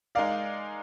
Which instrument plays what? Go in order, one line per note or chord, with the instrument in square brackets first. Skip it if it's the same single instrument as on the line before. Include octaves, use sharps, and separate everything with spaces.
[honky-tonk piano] G#3 D#4 A#4 D5 [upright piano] F5